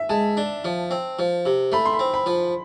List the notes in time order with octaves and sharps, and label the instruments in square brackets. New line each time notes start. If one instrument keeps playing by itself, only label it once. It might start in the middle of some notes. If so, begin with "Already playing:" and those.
Already playing: [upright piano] E5
[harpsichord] G#3 [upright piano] A5
[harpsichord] D4
F3
C4
F3
C3
[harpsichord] A3 [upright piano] B5
[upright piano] C6
B5
[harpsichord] C4
[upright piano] B5
[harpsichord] F3